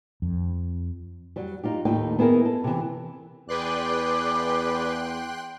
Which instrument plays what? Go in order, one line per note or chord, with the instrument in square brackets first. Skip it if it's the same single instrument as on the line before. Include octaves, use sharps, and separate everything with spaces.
[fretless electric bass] F2
[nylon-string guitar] F#3 G3
D#4 F4 G4
D#2 A2 D#4 G5
B3 E4 G#4 A#4
A4
C3 E3
[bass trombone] E2 [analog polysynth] G#4 B4 D5 [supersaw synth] G5 C6 F#6 [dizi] D6